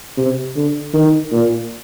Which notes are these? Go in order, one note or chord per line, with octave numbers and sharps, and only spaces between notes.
C3
D3
D#3
A#2